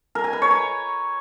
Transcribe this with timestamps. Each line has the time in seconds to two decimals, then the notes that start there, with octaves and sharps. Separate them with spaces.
0.15 A#4
0.24 G#5
0.33 B4
0.42 C#5
0.51 A#5